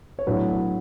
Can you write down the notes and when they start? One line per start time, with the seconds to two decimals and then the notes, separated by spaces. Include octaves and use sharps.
0.19 C#5
0.27 A2 F#3 B3 D4 B4